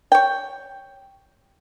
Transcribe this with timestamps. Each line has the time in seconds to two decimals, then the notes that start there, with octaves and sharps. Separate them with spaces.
0.12 C#5 G5